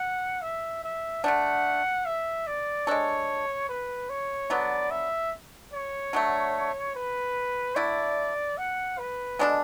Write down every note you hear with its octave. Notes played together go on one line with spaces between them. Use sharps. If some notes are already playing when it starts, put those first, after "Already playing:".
Already playing: F#5
E5
E5
D3 A3 D4 F#5
E5
D5
G#3 D4 A4 C#5
B4
C#5
D3 F#3 B3 D5
E5
C#5
D3 F#3 A3
B4
D3 A3 E4 D5
F#5
B4
B2 G#3 D4 A4